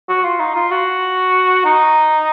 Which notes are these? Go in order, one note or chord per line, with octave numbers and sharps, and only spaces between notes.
F#4
F4
D#4
F4
F#4
D#4